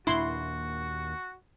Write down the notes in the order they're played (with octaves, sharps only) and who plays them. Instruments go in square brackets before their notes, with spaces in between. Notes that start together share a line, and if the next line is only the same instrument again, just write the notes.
[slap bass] D#2 A#2 D4 [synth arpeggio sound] E4 C6 [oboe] F#4